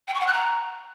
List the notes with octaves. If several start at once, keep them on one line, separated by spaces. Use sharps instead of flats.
G5
C#6
F#5
F#6
A#5